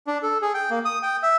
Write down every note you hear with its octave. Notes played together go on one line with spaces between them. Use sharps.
D4
A4
G#4
G5
A#3
D#6
G5
E5